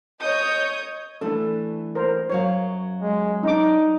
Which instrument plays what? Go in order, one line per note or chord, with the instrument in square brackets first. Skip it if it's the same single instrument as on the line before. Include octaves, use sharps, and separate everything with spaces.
[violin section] C#5 D#5 D#6 G6
[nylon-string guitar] E3 A3 D4 [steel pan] A4
[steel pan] A#4 C5
[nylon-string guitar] F#2 F#3 F5 [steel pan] C#5
[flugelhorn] G#3
[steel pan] D4 D6 [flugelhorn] D#4